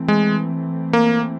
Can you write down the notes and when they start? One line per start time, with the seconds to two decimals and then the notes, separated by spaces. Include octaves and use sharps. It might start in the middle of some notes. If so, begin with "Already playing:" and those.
Already playing: E3 A3 C4
0.08 G#3
0.93 A#3